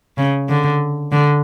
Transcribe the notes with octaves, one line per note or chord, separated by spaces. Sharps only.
C#3
D3
D3